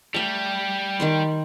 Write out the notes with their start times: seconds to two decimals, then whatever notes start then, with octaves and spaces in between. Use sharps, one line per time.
0.15 G3 A3 G5
1.00 D#3 G5 C6